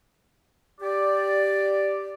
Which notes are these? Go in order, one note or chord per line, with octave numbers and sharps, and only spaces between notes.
G4 D5